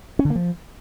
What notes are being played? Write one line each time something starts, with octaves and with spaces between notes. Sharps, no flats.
C#4
D3
A#3
F3